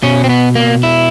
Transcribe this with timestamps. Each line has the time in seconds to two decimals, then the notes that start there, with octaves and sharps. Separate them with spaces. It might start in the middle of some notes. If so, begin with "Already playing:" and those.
0.03 B2 C#4
0.24 C4
0.29 B3
0.55 A#3
0.83 E4